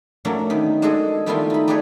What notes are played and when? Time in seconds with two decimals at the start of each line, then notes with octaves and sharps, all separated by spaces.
0.25 D3 F#3 A3 A#3 C#4 D4
0.50 D#3 B3
0.82 G#3 D4 F#4 G#4 A4 D#5
1.26 D#3 G3 A3 B3 E4 F4
1.50 D#4 B5
1.68 G3 D4 G4 G#4 B4 C#5